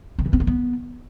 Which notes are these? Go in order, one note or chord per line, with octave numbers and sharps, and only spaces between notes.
D#3
E3
C4
A#3
B3